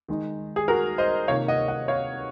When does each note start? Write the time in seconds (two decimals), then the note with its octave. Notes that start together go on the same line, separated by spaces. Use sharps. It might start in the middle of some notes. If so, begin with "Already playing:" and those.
0.08 D#3 G#3 D#4
0.56 G#4
0.68 F#4 A#4
0.98 C5 D#5
1.28 C3 D#3 A#3 F4 C#5 F5
1.48 D#5 F#5
1.68 D#5 F#5
1.88 C#5 F5